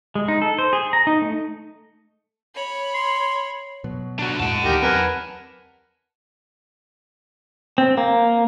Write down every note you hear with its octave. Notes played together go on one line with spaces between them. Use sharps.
G#3
D#4
A4
C5
G#4
A#5
D#4
A3
C#5 B5
C6
B2 F#3
D4 F#4
F2 A2 G#3 F#5 A5
D2 D#3 E3 D#4 G4 A#4
E2 F#3 C4 A#4 B4 G#5
C4
A#3